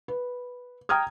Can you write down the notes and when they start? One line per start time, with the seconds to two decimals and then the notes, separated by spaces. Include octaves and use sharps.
0.08 B4
0.89 G5 A#5 D#6 F6 G#6